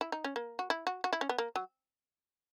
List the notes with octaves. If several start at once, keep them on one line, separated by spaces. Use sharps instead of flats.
E4
D#4
C#4
A#3
F#4
E4
F#4
F#4
E4
C#4
B3
A#3
F#3